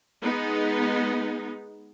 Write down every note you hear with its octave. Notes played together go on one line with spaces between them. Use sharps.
G#3 B3 D#4